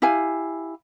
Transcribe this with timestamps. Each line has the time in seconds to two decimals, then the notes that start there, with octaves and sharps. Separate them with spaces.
0.02 E4 G4 F5 G#5